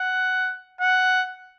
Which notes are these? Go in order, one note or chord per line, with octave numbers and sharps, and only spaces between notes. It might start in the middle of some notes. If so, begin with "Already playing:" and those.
Already playing: F#5
F#5